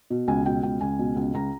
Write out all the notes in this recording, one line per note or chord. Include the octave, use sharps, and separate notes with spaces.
B2
C#2 G#5
B2 G5
C#2 G5
C#2 G#5
B2
C#2
C#2 A#5